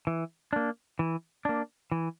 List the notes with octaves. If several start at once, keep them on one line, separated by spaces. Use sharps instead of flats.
E3
A#3 D4
E3
A#3 D4
E3